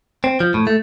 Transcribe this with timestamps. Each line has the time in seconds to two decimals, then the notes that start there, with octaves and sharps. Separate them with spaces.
0.24 C4
0.40 F3
0.54 A2
0.67 A3